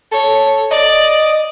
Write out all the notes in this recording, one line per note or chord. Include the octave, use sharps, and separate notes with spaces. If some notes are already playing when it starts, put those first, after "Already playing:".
A4 C#5
D5 D#5